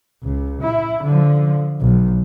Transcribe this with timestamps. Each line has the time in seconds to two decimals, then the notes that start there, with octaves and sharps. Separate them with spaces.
0.23 C#2
0.62 E4
1.04 D3 F3
1.81 B1